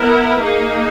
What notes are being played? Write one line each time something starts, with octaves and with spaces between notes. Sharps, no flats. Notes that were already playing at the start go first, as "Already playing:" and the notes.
Already playing: B3 E4 A#4
A#3 D#4 G#4